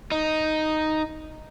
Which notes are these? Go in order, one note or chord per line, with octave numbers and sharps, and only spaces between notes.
D#4